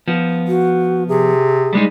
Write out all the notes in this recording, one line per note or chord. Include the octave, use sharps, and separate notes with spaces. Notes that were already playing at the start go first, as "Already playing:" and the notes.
F3 B3
F#4
C3 G#4
G3 G#3 D#4